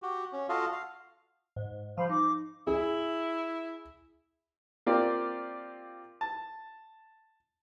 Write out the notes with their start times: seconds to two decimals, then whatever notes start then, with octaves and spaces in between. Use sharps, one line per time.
0.02 F#4 G4
0.33 C#4
0.49 F4 F#4 A4 D#5 F5
0.72 F5
1.56 G#2
1.97 F3 G3 C5 F5 B5
2.09 D#4 D6
2.67 E4 G#4
4.86 A#3 C4 F4 G4 D5
6.21 A5